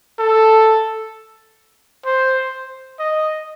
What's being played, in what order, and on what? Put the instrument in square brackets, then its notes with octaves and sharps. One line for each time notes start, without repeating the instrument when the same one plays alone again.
[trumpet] A4
C5
D#5